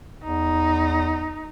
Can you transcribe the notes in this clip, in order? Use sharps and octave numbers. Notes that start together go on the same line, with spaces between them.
E2 D#4